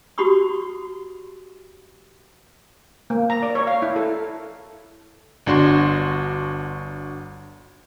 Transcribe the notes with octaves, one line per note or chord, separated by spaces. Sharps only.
F#4 G4 B5 C#6 D#6
A#3
A#5
D5
C#5
F5
E4
A4
G1 D4 F#4 C6